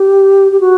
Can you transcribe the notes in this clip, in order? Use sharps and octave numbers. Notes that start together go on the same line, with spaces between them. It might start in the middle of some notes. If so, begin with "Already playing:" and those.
Already playing: G4
G4
F#4